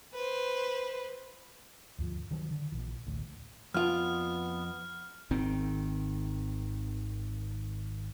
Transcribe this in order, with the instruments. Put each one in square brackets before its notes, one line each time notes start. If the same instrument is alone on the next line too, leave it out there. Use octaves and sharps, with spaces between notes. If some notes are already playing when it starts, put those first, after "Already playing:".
[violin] B4 C5
[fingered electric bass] D2 G2 F3
D#3 E3 F#3 G3
D3
A#1 E3
A1 D2
[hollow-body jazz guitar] F2 F4 [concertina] B3 [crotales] F6
[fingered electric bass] G#1 D#3 C4